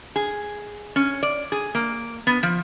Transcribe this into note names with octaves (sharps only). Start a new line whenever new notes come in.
G#4
C#4
D5
G#4
A#3
B3
F3